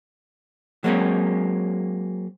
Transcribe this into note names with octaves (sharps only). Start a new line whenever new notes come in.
F#3 G#3 A#3 C4 C#4